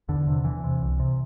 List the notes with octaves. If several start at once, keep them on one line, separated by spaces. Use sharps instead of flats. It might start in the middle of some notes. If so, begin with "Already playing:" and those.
E2 D3
C3
E2 E3
C3
C2
C3